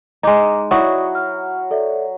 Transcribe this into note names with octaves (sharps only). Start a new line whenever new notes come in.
G#3 D#4 A#5 D6
F#3 E4 F#4 D5 C#6 D#6
F6
A4 D5 E5